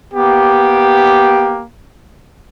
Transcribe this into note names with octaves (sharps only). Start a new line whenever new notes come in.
A#3 B3 G4